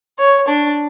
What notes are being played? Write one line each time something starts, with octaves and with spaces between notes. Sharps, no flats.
C#5
D4